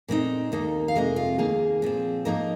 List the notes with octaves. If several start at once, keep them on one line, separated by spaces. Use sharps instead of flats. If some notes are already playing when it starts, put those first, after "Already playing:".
A#2 G#3 C4 D#4
D#2 D#3 A#3 D#4
F5
F2 C3 G#3 A#4 D#5
F4
D#2 D#3 A#3 G#4
A#2 F3 C4
G#2 F3 A#3 D#4 A#4 D#5